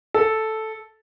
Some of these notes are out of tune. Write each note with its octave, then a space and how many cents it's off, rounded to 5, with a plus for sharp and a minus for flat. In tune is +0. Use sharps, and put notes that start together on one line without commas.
A4 -5